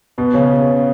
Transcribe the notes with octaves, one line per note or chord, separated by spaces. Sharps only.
B2 B3
C#3 C#4